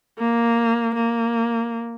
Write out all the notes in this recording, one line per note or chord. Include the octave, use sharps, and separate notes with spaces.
A#3
A#3